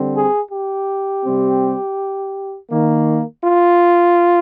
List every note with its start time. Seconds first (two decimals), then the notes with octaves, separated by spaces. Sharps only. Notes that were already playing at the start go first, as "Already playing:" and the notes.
Already playing: D3 G3 C4
0.14 G#4
0.49 G4
1.23 C3 G3 C4
2.70 D#3 A#3
3.43 F4